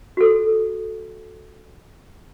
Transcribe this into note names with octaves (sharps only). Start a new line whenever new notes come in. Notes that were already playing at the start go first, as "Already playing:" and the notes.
F#4 A4